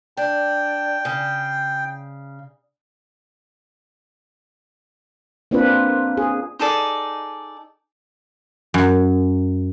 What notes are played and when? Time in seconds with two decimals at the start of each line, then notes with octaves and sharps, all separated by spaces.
0.17 D4 G5
1.05 C#3
5.51 A#3 C4 D4 F4 B4
6.17 G#4
6.59 D#4 G#4 A4 D5
8.74 F#2